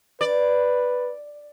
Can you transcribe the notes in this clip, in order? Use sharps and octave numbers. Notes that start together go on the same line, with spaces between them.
B4 D5